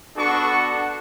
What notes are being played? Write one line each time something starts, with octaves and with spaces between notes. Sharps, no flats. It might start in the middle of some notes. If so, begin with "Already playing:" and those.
B3 D4 F#4 A4 F#5 C#6